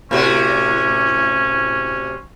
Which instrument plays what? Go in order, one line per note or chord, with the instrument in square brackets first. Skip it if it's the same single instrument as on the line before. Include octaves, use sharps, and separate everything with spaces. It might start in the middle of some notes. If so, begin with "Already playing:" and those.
[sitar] A2 C3 F#4 [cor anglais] C#4